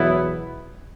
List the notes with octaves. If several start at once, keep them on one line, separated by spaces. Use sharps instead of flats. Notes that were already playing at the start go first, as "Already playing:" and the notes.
Already playing: E2 B2 F#3 B3 E4